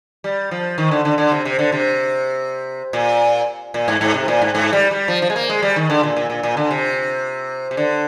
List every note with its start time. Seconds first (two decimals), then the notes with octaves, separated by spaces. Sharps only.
0.24 G3
0.51 F3
0.78 D#3
0.91 D3
1.05 D3
1.18 D3
1.32 C3
1.45 C3
1.59 D3
1.72 C3
2.93 A#2
3.74 A#2
3.88 G#2
4.01 G#2
4.14 C3
4.28 A#2
4.41 G#2
4.55 G#2
4.73 G3
4.91 G3
5.08 F3
5.22 F3
5.30 G#3
5.36 A#3
5.49 G#3
5.62 G3
5.76 D#3
5.90 D3
6.03 A#2
6.16 A#2
6.30 A#2
6.43 A#2
6.57 D3
6.71 C3
7.71 C3
7.77 D3